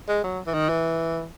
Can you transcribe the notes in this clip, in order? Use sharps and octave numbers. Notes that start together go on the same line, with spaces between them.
G#3
F#3
E3
D#3
E3